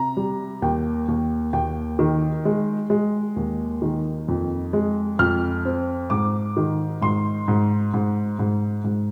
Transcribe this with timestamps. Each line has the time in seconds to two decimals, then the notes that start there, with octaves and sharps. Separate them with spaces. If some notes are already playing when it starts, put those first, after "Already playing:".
Already playing: C3 A#5
0.17 G3
0.62 D#2 G5
1.08 D#2
1.53 D#2 G5
1.99 D#3
2.45 G#3
2.90 G#3
3.36 D#2
3.82 D#3
4.28 F2
4.73 G#3
5.19 F2 F6
5.65 C4
6.10 G#2 D6
6.57 D#3
7.01 G#2 C6
7.48 G#2
7.94 G#2
8.39 G#2
8.84 G#2